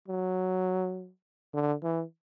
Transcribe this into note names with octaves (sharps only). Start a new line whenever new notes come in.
F#3
D3
E3